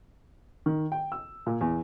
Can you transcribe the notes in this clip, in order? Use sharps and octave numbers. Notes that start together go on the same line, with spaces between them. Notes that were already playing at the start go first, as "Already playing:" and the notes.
D#3
G5
E6
A#2
E2